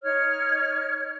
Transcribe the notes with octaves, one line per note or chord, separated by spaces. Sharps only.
D#4 C#5 F6